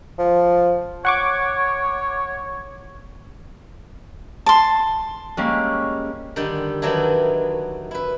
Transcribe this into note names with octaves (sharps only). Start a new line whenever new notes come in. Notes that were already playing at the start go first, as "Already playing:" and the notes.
F3
C#5 F#5 C#6 D6
A5 C6
G3 G#3 A#3 C#4
D3 D#3 G3
D#3 E3 F#3 D4 E4
E4 B4